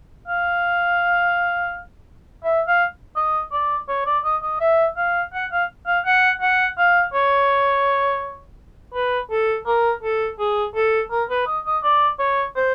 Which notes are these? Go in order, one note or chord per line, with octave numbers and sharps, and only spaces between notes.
F5
E5
F5
D#5
D5
C#5
D5
D#5
D#5
E5
F5
F#5
F5
F5
F#5
F#5
F5
C#5
B4
A4
A#4
A4
G#4
A4
A#4
B4
D#5
D#5
D5
C#5
C5